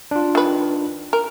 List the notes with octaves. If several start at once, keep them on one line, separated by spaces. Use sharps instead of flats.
D4 F4
D#3 B4
A#4